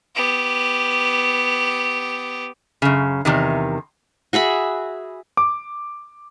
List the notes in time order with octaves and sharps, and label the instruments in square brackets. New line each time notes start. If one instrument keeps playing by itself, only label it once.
[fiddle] B3 G4
[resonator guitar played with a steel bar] F#2 C#3
E2 C3 D#3
[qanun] F#4 G#4 E5 B5
[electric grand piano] D6